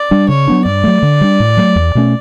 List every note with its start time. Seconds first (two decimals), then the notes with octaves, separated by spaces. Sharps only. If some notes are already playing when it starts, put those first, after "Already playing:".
Already playing: D5
0.11 G3 D4
0.28 C#3 C#5
0.48 F#3 B3 D4
0.65 G2 D5
0.84 F#3 A3
1.03 D3
1.21 G3 D4
1.40 A2
1.57 F#3 A3
1.76 E2
1.95 B2 A3 C#4